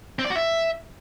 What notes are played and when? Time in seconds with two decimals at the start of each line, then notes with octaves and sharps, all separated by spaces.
0.19 C4
0.24 D5
0.30 F#4
0.36 E5